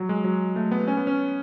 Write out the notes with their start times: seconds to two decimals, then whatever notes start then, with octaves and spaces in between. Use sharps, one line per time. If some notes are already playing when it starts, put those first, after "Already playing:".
Already playing: F#3
0.09 G#3
0.24 F#3
0.56 A3
0.71 B3
0.88 C#4
0.97 B3
1.07 C#4